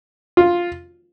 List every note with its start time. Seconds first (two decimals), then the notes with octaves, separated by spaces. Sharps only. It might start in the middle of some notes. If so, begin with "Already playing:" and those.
0.37 F4